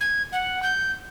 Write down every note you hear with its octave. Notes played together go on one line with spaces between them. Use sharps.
G#6
F#5
G6